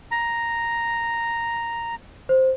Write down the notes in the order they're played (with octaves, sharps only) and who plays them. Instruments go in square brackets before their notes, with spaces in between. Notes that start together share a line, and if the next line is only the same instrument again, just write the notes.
[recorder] A#5
[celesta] C5